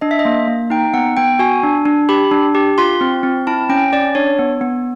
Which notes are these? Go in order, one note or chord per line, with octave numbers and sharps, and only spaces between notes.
D4 D#5
E5
D#5
A#3
A#3
D#4 G5
B3 F#5
B3 G5
F#4 G#5
D4
D4
G4 B5
D4
G4
F4 C6
C4
C4
E4 A5
C#4 G5
C#4 D5
D4 C#5
B3
B3